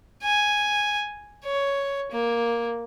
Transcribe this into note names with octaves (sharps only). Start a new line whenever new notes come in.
G#5
C#5
A#3